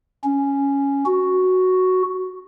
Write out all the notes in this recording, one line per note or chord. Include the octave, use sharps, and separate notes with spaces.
C#4
F#4